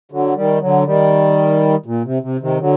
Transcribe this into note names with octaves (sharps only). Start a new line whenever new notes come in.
D3 F#3
D#3 G3
D3 F#3
D#3 G3
A#2
C3
C3
C3 D#3
D3 F#3